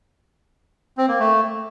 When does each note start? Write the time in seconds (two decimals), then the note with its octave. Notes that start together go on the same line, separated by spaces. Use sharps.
0.97 C4
1.08 A#3
1.19 A3